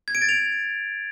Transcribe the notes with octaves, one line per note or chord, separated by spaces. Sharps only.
G#6
D7
A6
F7